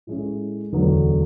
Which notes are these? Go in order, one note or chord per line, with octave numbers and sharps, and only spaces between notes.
A2 G#3 C#4 E4
E1 D2 D3 F#3